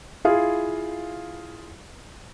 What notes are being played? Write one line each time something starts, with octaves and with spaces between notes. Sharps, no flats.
E4 F4 G#4 F5